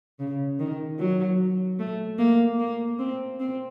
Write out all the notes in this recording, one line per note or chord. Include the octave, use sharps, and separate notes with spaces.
C#3
D#3
F#3
A3
A#3
A#3
C4
C4